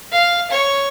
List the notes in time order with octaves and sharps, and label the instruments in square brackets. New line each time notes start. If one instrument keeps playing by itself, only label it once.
[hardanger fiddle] F5
C#5